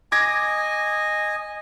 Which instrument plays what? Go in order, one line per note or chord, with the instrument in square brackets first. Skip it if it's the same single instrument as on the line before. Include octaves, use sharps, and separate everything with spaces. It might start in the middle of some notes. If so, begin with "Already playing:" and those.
[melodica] D#5 G#5 [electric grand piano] D6 G#6 A#6